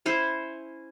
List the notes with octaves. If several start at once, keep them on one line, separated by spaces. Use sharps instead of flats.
C#4 E4 C5